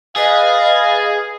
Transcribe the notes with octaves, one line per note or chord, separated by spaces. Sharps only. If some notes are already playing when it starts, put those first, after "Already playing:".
G#4 B4 D#5 F5 G#6 A6